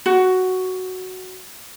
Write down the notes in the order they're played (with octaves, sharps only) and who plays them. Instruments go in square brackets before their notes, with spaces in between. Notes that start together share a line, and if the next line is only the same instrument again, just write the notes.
[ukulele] F#4